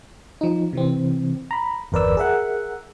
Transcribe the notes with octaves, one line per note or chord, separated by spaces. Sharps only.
F3 D#4
C3 E3 C4
A#5 B5
G1 E2 A#4 B4 D5 E6
G#4 A#4 E5 F#5